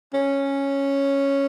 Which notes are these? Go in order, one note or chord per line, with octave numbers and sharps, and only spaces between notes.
C#4